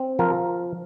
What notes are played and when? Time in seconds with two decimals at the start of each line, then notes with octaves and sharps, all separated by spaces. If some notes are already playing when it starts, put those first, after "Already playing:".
Already playing: C4
0.19 F3 A#4